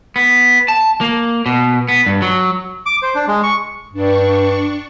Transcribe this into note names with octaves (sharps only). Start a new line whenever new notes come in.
B3
A5
A#3
B2
B3
G2
F#3
D6
C5
D4
G#3
C#6
G2 D4 C#6